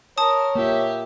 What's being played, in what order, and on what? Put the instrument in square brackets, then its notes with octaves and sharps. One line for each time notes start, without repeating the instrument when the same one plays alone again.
[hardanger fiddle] A#4 [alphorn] C#5 [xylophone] A5 D#6
[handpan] A#3 F4 [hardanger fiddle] G4 E5